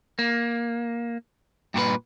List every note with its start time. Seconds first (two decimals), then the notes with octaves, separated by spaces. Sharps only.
0.19 A#3
1.74 G2 A#2 F#4 B4